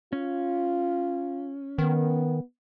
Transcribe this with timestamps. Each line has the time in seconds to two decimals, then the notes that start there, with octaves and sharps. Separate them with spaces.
0.13 C#4 F4
1.78 D#3 B3